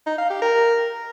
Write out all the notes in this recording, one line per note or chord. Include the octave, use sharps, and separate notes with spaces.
D#4
F5
G4
A#4